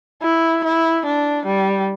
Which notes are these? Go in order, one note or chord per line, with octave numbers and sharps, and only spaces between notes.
E4
E4
D4
G3